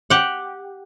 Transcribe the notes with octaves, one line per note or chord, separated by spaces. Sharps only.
G4 F#5